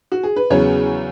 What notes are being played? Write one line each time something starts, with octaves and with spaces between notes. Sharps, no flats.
F#4
G#4
B4
E2 C#3 F#3 B3 C#5